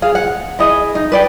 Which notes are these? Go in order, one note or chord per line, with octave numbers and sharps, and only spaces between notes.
G#4 F5
F#5
E4 G#4 D#5
D#4
B4 D5 G5